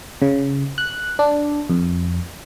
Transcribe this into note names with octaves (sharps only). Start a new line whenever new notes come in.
C#3
F#6
D4
F2